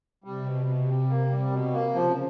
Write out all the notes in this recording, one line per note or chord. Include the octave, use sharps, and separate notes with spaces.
C3 G3
B2
B2
G3
A#3
G3
B2
A#3
C#3 F3